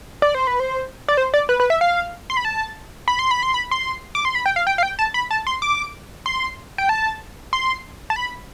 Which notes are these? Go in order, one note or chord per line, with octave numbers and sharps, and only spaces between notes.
D5
C5
B4
C5
D5
C5
D5
B4
B4
E5
F5
C6
B5
A5
B5
C6
B5
C6
B5
C6
D6
C6
B5
G5
F5
G5
F5
G5
A5
B5
A5
C6
D6
C6
G5
A5
C6
A5
B5